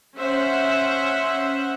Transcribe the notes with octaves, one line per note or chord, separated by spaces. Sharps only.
C#4 C5 E5 F#5